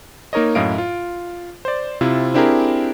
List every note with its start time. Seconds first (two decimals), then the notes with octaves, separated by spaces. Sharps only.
0.33 A#3 D#4 A#4 C#5 D#5
0.55 F#2 A2 E4 D#5 F5 D7
0.78 F4
1.65 C5 D5
2.01 C3 C4 E4 F4
2.34 C4 D4 E4 G4 G#4 A#4